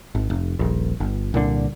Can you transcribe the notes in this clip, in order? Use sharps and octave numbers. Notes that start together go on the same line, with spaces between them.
G#1
F1
D#1 A#1
G1
C2 A#2 D3